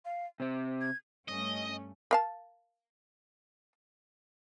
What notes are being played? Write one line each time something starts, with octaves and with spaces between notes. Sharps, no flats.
F5
C3 C4 C5
G#6
G2 A3 C#4 D#5
A#4 F5 A5